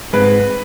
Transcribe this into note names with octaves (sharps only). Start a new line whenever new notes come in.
G#2 G#3 C4 B4